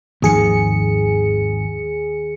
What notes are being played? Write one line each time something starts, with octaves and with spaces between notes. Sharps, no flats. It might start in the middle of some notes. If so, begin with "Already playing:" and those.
G#1 D#2 D#3 F3 G#4 C#7